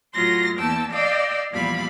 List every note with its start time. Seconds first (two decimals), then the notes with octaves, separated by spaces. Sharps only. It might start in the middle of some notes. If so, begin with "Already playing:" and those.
0.14 A2 F#3 F4 C6 A#6
0.57 E2 A#3 G5 A5 E6
0.92 D5 D#5 F5 G5 E6
1.51 E2 A#2 F3 G3 F5 B5